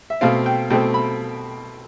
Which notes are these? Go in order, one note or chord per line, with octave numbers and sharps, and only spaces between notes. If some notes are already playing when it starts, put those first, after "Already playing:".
E5
B2 A3 C4 F5
G5
B2 A3 C4 G5
B5